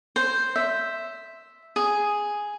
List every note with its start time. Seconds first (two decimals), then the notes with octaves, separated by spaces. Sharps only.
0.16 C5
0.56 E5
1.76 G#4